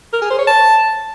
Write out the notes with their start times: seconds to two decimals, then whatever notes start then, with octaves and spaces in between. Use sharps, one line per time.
0.13 A#4
0.22 G#4
0.30 C5
0.39 C#5
0.47 A5